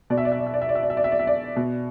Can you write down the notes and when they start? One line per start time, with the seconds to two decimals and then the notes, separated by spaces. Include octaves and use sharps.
0.10 B2 D5
0.18 E5
0.25 D5
0.32 E5
0.39 D5
0.47 E5
0.54 D5
0.62 E5
0.69 D5
0.75 E5
0.83 D5
0.90 E5
0.97 D5
1.04 E5
1.12 D5
1.19 E5
1.27 D5
1.56 B2